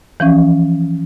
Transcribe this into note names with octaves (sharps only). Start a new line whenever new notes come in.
E3 F3 C#4